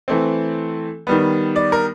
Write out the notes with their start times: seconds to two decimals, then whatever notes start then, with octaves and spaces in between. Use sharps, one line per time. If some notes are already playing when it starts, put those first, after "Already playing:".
0.08 E3 A3 C4
1.07 D#3 G3 B3
1.56 D5
1.72 A#4